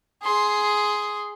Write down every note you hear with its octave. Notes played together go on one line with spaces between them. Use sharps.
G#4 C6